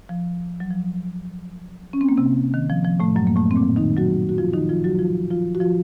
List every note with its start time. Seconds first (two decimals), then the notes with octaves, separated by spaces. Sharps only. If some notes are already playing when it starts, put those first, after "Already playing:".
0.09 F3
0.60 F#3
0.70 F3
1.93 C#4
2.01 C4
2.09 A#3
2.18 C3 C4
2.54 D#3
2.70 F3
2.84 F3
3.00 A2 A3
3.16 F#2 F#3
3.27 A#3
3.36 A2 A3
3.51 C4
3.56 A#2 A#3
3.76 D#3 D#4
3.97 F#3 F#4
4.29 F#4
4.38 F3 F4
4.53 D#3 D#4
4.69 F3 F4
4.84 F#3 F#4
4.99 F3 F4
5.30 F3 F4
5.55 F#4
5.60 F3 F4